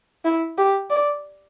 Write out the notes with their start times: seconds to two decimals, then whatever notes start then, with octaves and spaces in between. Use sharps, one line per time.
0.25 E4
0.58 G4
0.90 D5